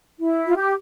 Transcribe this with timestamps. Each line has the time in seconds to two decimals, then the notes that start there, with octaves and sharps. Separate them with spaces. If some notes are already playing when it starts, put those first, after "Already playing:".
0.20 E4
0.46 F4
0.56 G4